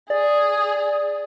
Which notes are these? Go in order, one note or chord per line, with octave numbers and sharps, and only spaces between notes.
G#4 D5